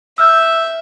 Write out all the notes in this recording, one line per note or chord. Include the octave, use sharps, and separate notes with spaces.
E5 E6 F6 G6